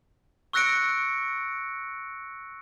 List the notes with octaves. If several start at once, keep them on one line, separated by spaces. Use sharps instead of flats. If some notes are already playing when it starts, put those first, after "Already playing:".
C#6 E6 F#6 A#6 C#7 D7